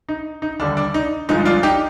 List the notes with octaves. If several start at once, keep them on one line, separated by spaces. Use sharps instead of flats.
D#4
D#4
D#2 D3 G3 D4
D4
D#4
G1 G2 F3 G#3 D#4
D4 F4
D#4 G4